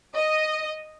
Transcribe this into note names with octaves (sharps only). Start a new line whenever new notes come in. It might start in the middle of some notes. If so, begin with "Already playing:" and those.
D#5